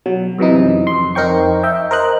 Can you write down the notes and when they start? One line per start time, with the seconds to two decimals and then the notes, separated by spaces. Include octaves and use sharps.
0.06 B2 F#3
0.39 F#2 C3 E3 D#4
0.87 F2 C6
1.15 F2 D#4 A#4 C5 G5 C#6
1.63 D#5 E5 G5
1.91 A#4 C5 D#5 F#6